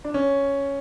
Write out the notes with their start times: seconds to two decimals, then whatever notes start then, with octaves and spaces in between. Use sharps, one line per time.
0.04 D4
0.14 C#4